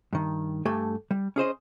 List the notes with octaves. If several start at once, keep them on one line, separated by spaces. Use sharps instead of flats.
G2 D#3
G2 A3 G4 A4 G#5
G3
C#4 G#4 C5 D#5